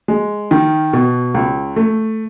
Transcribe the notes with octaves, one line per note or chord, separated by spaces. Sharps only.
G#3
D#3
B2
C#2
A3